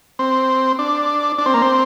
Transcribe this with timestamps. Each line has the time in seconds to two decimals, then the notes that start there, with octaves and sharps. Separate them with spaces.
0.19 C4
0.79 D4
1.38 D4
1.46 C4
1.54 A#3
1.62 C4